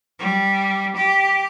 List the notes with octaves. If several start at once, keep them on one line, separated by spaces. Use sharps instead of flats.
G3
G4